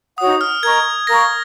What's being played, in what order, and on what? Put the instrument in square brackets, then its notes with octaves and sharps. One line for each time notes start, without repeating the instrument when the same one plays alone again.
[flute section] D#4 F#4 C#5 F#5 [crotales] D#6
[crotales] F6
[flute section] A#4 D#5 A#5 C#6 [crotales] G#6
[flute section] A#4 F5 A#5 C#6 [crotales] A#6